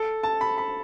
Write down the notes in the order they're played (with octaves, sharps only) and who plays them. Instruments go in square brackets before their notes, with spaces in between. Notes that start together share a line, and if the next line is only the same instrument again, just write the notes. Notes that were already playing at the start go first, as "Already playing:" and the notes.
Already playing: [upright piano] A4
A5
B5
B5